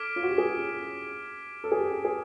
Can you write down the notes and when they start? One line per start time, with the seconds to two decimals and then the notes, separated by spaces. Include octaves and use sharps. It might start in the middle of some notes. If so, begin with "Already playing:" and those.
Already playing: A4 D6 F6 G#6 B6 D7
0.16 F4
0.23 F#4
0.30 G4
0.38 G#4
1.64 A4
1.72 G#4
1.78 G4
2.05 G#4